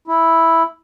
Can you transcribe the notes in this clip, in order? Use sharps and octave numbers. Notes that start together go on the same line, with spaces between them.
E4